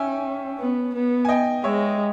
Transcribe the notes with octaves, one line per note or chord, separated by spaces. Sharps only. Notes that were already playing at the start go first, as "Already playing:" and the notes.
Already playing: C#4 E5 G5 G#5
B3
B3
G#5
D#5 G5
G#3 C#5 E5